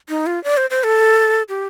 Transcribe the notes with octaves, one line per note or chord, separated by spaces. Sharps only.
D#4
F4
D5
C5
C5
A4
G4